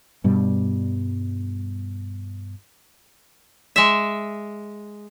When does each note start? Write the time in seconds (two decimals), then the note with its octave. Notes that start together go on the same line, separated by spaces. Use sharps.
0.24 G2 B2 G3
3.76 G#3 E5